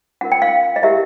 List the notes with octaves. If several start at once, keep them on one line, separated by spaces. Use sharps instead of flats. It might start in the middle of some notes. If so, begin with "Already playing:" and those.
C#4 F4 A#4 F#5
G5
F5
D#5
E4 G4 A#4 E5